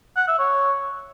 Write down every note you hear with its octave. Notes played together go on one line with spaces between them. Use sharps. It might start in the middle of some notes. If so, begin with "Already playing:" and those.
F#5
E5
C#5